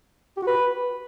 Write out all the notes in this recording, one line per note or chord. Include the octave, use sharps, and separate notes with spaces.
G4
F#4
B4